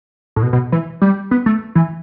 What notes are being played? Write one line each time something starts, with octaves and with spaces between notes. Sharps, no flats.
A2
B2
B2
E3
G3
B3
A3
E3